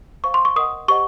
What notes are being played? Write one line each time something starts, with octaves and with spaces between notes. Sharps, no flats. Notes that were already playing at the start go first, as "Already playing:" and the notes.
C5 F5 C#6
C6
C#6
A#4 D#5 F#5 D#6
G4 C5 D#5 F#5 C#6